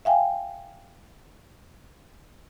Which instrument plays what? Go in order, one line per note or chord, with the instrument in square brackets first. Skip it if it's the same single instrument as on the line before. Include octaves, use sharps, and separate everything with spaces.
[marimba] E5 F5 G5 G#5